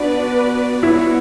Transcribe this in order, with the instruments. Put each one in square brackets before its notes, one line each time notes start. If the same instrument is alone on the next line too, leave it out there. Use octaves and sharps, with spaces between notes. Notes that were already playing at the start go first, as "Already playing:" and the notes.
Already playing: [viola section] B3 F#4 B4 D5 [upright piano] D4
[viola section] B3 F#4 C#5 [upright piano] E4